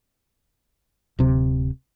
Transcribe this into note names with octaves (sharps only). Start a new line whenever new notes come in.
D1 C3